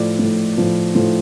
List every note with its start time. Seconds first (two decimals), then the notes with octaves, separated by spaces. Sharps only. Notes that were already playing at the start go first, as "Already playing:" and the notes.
Already playing: A2 F3 D5
0.19 A2 F3
0.57 A2 F3
0.95 A2 F3